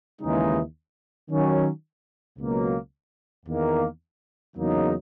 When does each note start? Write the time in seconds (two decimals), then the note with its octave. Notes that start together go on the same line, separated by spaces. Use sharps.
0.21 D#2 C#3 E3 G#3 D#4
1.30 D#3 F#3 C#4
2.38 C#2 B2 F#3 A#3
3.46 E2 D#3 A#3
4.56 E2 C#3 F#3 A#3 D#4